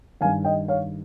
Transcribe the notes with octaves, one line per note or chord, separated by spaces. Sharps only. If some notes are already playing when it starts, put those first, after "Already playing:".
G2 D#3 F5 G#5
D#5 G5
C#5 F5